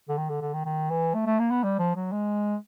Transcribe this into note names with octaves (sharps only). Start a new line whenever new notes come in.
D3
D#3
D3
D3
D#3
D#3
E3
A3
A3
A#3
B3
G3
F3
F#3
G#3